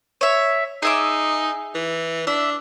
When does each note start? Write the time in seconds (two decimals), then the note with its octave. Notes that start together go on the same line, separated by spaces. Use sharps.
0.21 C#5 E5
0.83 D#4 G#4 E5 D6
1.75 E3
2.27 D4 E5